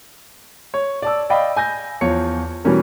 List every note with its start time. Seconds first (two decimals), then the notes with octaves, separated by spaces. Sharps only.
0.74 C#5
1.02 D5 A5 E6
1.30 D5 D#5 F5 G5 B5
1.57 G#5 G6 A#6
2.01 E2 F3 C#5 C#7
2.65 B2 E3 G3 C#4 A#4